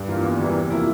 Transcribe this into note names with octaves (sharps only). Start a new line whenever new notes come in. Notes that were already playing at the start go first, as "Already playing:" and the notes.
Already playing: G2
E3 A#3 F4
E2
E3 G3 A#3 E4
C3
F3 A#3 E4